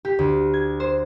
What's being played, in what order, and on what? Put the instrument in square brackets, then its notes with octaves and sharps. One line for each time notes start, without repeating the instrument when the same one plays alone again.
[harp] G4
D2
G#6
C5